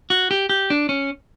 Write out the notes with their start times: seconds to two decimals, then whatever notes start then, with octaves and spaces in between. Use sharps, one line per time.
0.10 F#4
0.31 G4
0.49 G4
0.70 D4
0.89 C#4